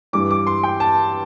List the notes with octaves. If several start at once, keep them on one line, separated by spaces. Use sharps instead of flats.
G2 E3 G3 D6
D6
C6
G5
A5